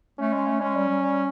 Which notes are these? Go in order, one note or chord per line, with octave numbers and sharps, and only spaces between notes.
A3 C#4
G#3
A3
G#3 C#4
G3
G3
G3